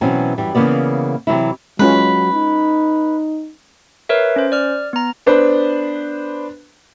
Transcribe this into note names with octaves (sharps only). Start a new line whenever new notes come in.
B2 E3 F#3 C4 C#4
F#2 E3 G3
C#3 E3 A#3 B3 D5
C3 E3 F#3 E4
F#3 G#3 C#4 F4 B4
D#4
A#4 B4 C#5 E5
C#4 C5
D5 F6
B3 A#5
B3 D4 B4 C5